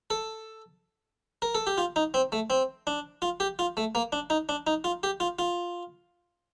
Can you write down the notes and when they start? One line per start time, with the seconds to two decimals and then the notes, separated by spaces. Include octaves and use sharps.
0.10 A4
1.42 A#4
1.55 A4
1.67 G4
1.78 F4
1.96 D#4
2.14 C4
2.32 A3
2.50 C4
2.87 D4
3.22 F4
3.40 G4
3.59 F4
3.77 A3
3.95 A#3
4.12 D4
4.30 D#4
4.49 D4
4.67 D#4
4.84 F4
5.03 G4
5.20 F4
5.39 F4